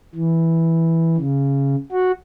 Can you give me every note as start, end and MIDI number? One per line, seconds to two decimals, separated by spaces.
0.15 1.17 52
1.17 1.75 49
1.92 2.12 66